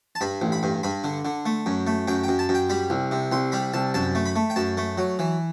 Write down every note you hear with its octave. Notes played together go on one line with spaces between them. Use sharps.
A5
G2 B5
A1
B5
G2
G2 B5
D3
D3
A3
F#2
A3
F#2 G5
F#2 G5
A5
F#2
G5
G3 B5
C2
C3
C2 C6
G3 B5
C2 A5
F#2 A5
A3
B5
A3
G5
F#2 A5
A3
F#3
E3